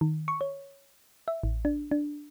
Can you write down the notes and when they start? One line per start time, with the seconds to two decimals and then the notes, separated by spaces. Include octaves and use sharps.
0.01 D#3
0.28 C#6
0.41 C#5
1.28 E5
1.43 A1
1.65 D4
1.91 D4